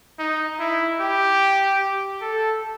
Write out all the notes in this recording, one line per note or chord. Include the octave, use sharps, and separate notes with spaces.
D#4
E4
G4
A4